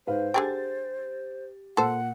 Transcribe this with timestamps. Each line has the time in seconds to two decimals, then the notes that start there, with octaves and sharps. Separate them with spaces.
0.07 G#2 B4 C5 F5
0.34 D3 G4 G#4 G5 A6
1.77 A#2 A4 C5 F#5